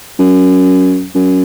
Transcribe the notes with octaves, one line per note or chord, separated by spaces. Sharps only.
F#2
F#2